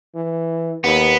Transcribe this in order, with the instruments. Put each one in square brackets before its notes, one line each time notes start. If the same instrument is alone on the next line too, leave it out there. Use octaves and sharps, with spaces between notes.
[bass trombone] E3
[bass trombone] D#2 [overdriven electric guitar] B3